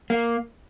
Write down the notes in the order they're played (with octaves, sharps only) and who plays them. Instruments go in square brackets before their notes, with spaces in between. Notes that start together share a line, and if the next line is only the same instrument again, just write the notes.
[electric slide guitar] A#3